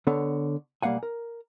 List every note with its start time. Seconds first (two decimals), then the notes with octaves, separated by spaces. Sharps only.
0.07 D3 B3 A4 C#5
0.82 B1 G3 A#3 F5 F#5 G#5
1.03 A#4